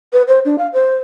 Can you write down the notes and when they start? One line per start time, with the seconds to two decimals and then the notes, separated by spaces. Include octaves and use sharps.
0.13 B4
0.28 C5
0.45 D4
0.58 F5
0.73 C5